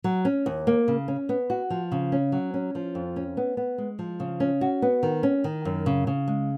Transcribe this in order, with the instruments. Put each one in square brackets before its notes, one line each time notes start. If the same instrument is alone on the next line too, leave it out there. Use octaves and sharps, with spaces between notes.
[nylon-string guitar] F#3
C#4
D#2
A#3
C#3
C#4
B3
F#4
F3
C#3
C#4
F#3
C#4
F3
F2
C#4
B3
B3
G#3
F3
C#3
C#4
F#4
B3
D#3
C#4
D#3
F#2
C#3
C#3
G#3